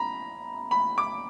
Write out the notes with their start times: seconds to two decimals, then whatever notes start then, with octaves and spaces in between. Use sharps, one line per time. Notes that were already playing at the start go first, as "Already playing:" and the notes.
Already playing: A#5 B5
0.71 B5
0.98 D6